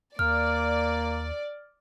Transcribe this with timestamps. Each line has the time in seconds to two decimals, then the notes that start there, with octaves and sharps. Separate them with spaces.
0.19 D#2 A#3 D5 F6